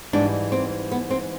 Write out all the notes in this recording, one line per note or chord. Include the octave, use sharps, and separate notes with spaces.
G#2 E3 G3 D4
C4
B3
C4